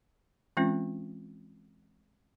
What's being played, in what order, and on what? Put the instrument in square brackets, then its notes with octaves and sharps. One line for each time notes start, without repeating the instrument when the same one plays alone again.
[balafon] E3 G#3 C4 C#4 F4